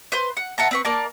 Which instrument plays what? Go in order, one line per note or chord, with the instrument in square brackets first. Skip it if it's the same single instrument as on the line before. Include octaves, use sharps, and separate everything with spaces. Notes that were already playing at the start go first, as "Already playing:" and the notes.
[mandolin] B4 C5 C6
F#5
E5 F#5 A5 A#5
C4 B4 C#6
A#3 A#4 D5 A5